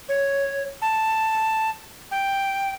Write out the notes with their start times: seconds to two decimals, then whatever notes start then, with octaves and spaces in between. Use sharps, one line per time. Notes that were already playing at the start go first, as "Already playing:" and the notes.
0.09 C#5
0.82 A5
2.11 G5